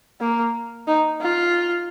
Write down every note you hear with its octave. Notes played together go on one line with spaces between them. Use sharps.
A#3
D#4
F4